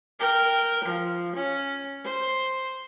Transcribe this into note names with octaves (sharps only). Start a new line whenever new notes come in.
A#4 G5
F3
C#4
C5